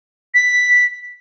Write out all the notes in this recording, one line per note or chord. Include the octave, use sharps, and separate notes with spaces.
B6